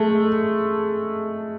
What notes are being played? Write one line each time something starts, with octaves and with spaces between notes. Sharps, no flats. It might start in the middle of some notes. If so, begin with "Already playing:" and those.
Already playing: G#3 A3